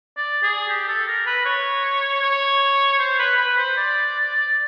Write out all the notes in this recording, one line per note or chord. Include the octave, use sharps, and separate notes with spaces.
D5
G#4
G4
A4
A#4
B4
C#5
C#5
C5
B4
B4
C5
D5